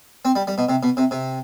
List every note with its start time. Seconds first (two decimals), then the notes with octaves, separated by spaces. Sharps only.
0.25 C4
0.36 G3
0.47 G3
0.58 B2
0.69 C3
0.83 B2
0.97 C3
1.11 C3